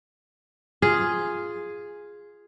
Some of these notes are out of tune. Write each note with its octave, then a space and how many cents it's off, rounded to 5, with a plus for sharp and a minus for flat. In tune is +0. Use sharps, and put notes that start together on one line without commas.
F4 +0 G#4 +0